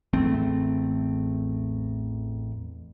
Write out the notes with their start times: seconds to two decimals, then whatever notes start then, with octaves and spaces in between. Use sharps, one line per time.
0.13 A1 E2 A3 C4